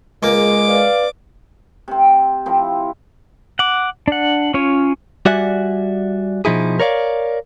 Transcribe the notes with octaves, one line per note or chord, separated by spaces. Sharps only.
C#2 G#3 A#3 D6
B4 D5 F5
C3 C4
F3 C4 E4
F#5 D6
D4 F#5
C#4 F4 C#5
G3 F#4 D5 E5 F#5 G#5
B2 F3 D#4 E4 G#4
A#4 C#5 D5 F5